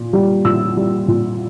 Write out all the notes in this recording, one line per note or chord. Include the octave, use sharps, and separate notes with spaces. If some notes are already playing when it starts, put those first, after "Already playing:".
Already playing: A#2
G3
A#2 E6
G3
A#2